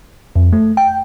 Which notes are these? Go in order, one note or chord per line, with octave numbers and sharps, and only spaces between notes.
F2
A3
G5